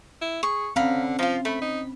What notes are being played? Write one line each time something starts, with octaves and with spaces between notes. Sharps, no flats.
E4
G#4 C#6
D3 C4 C#4 F5 A#5 B5
F3 D#4 F4
A3 B5
D#4